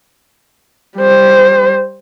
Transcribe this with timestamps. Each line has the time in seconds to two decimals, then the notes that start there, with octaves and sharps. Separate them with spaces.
0.98 G3 C5